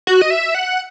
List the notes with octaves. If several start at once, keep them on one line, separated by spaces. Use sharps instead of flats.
F#4
D#5
E5
F#5